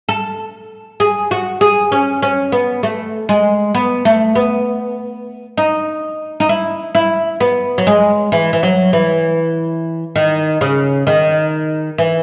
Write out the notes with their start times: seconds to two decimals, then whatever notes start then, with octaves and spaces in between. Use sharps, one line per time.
0.09 A4
1.00 G#4
1.31 F#4
1.61 G#4
1.92 C#4
2.23 C#4
2.52 B3
2.83 A3
3.29 G#3
3.75 B3
4.05 A3
4.35 B3
5.57 D#4
6.40 D#4
6.49 E4
6.95 E4
7.41 B3
7.78 F#3
7.87 G#3
8.32 E3
8.53 E3
8.63 F#3
8.93 E3
10.16 D#3
10.61 C#3
11.07 D#3
11.98 E3